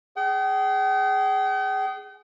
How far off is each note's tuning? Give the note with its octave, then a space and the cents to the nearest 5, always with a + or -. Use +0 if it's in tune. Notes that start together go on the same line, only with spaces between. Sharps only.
G#4 +0 G5 -45